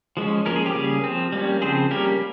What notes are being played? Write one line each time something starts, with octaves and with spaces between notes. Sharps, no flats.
F3 G#3 C#4
F3 A#3 C#4 A#4
G#4
G4
C#3 G3 A#3 C#4 G#4
F3 C4
G3 A#3 C#4
C#3 F3 C4 G#4 C5
G3 A#3 C#4 G4 A#4